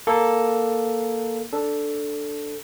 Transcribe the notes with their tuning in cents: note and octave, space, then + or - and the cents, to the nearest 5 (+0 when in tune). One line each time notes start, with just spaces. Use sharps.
A#3 +0 A4 +0
D4 +0 A4 +0